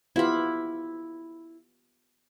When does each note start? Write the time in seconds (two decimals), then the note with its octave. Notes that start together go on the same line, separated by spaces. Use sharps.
0.16 B3 E4 F4 G4 B5